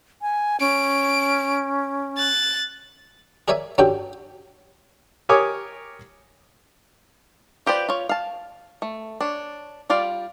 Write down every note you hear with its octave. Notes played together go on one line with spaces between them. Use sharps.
G#5
C#4 D7
F#6 A6
G#4 A#4 C#5 D5 E5 G#5
G2 C#4 D4 F#4 A4 G5
G4 A#4 C#5 G#5 D6 D#6
F4 G4 B4 C5 D5
F4 C#5
F5 A5
A3
D4 C#5
G3 F4 D5 F5